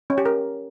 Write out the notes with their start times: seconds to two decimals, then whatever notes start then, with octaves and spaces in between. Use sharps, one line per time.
0.10 C#4
0.18 G4
0.25 A#4